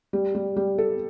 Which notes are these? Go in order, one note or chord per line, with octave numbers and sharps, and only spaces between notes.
G3
G3
G3
A4